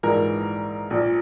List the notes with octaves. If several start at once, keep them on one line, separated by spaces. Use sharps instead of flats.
A#1 G#2 E3 A#4
A#1 A#2